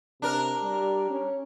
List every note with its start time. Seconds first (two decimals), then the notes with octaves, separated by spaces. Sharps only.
0.22 C3 D4 A#4
0.63 G3
1.10 C#4